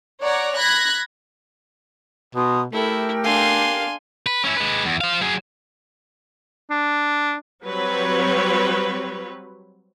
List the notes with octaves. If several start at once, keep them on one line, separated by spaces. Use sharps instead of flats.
C#5 D5 F#5 A#5
B5 F#6 G#6 A#6
B2 A#5 C6 D#6
A3 E4 G4 A4 A#4 G5
D4 F5 G#5 C6
B4
C#4 E4
G#3 B4
E2
C5 F5
F#3 G#4
D4
F#3 G3 C4 B4 C#5